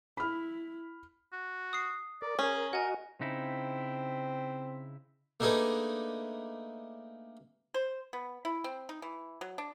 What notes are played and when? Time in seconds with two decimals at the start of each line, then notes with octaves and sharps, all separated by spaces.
0.17 E4 B5 F6
1.33 F#4
1.73 D#6 C7
2.22 A#4 D5
2.39 C#4 G#4 A#4
2.73 F#4 A#4 D#5 F#5 G#5
3.21 C#3 C4 D#4 E4
5.40 A3 A#3 D4 D#4 G#4 B4
7.74 C5
8.13 B3
8.45 E4
8.64 C4
8.89 D#4
9.02 E3
9.41 F#3
9.58 D4